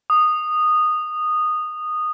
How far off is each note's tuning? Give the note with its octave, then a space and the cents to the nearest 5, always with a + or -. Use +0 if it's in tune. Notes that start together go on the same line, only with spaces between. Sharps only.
D#6 -15